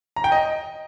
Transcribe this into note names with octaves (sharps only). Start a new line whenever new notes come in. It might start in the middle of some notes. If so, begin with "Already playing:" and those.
A#5
G5
D#5